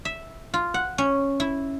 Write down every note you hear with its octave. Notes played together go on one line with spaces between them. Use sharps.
E5
F4
F#5
C#4
E4